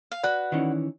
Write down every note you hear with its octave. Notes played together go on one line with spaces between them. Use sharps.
F5
F#4 B4 D5 F#6
D#3 E3 C#4